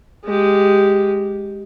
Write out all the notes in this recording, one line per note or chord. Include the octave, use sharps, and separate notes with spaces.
G#3 G4